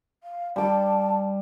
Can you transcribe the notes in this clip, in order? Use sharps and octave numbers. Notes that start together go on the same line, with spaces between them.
F5
G3 A5 D6